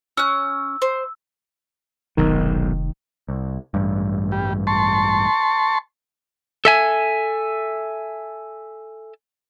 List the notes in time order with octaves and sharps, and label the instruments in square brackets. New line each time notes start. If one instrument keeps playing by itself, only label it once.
[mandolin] C#4 F#6 [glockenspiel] E6
[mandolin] C5
[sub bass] F1 [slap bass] B1 G#2 [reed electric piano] D#3
[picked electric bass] C2
A1 G2
[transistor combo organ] G3
A5 C6 C#6
[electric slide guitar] A4 E5 G#5